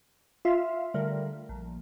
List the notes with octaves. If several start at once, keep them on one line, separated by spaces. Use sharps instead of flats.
F4 E5 F5
D3 G3 A3 A#4
A#1